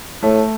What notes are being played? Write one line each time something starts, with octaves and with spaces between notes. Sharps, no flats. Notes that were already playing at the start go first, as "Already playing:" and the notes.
A2 A3